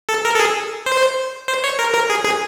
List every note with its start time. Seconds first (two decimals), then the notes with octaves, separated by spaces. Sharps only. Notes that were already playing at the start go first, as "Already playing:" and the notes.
0.09 A4
0.25 A#4
0.34 A4
0.40 G#4
0.86 C5
1.48 C5
1.64 C#5
1.79 A#4
1.94 A#4
2.10 G#4
2.25 G#4